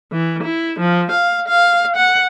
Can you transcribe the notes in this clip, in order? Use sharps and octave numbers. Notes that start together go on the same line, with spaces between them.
E3
E4
F3
F5
F5
F#5